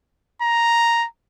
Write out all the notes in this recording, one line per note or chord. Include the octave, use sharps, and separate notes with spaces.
A#5